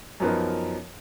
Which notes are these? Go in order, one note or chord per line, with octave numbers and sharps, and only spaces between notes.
F#2 F3 B3 D#4 A#4